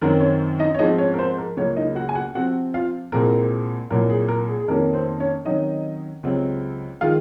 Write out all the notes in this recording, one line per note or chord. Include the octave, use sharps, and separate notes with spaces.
F#2 D#3 F#3 C4 A#4
C#4 C#5
D#4 D#5
C#5
G#2 F3 C4 D#4 D#5
C#4 C#5
A#4
C4 C5
A#4
C#2 C#3 F#3 A#3 C#4 C#5
D#4 D#5
F#4 F#5
G#5
F#4 F#5
C3 F3 C4 F#4 F#5
F4 F5
C2 A#2 G#3 C4 A#4
C2 A#2 F#3 A#4
G#4
A#4
G#4
G#4
F2 C3 D#3 A#3 C#4 A#4
C4 C5
C#4 C#5
C3 D#3 F#3 C#4 D#4 D#5
C#2 C3 F#3 C4
D#3 G#3 F4 F5